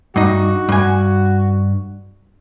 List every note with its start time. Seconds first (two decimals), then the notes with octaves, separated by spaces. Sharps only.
0.16 G2 D#4 F#4
0.69 G2 G#5